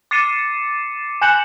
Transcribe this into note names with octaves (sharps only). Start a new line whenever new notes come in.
D6 A6 C7 C#7 D#7 E7
G#5 F#6 G6 C#7 E7 F#7